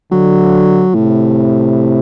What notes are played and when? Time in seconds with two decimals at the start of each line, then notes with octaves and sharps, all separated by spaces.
0.12 D3 F#3
0.95 A2 C3